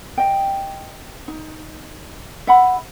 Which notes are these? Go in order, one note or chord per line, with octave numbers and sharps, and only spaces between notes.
D#5 G5
D#4
E5 F#5 B5